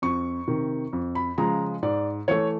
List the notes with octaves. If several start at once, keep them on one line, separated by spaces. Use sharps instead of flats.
F2 C#6
C3 D#3
F2
B5
C#3 F3 G#3 A#5
G#2 D5
E3 A3 C#5